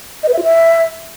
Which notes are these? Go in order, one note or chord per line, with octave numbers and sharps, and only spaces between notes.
D#5
B4
E5
F4
E5